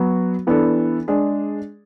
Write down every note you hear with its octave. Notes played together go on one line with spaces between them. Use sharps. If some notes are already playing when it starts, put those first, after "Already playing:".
Already playing: F#3 B3 F#4
E3 B3 D4 A4
G#3 D4 G#4